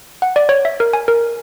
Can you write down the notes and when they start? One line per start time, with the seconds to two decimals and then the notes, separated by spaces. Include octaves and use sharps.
0.22 F#5
0.36 D5
0.49 C#5
0.65 E5
0.80 A#4
0.93 G#5
1.08 A#4